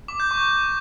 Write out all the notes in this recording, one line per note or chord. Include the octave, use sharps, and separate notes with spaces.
D6
G6
C#6